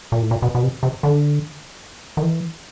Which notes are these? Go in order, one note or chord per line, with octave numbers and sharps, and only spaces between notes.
A#2
A2
A#2
B2
B2
C3
C3
D3
D#3
E3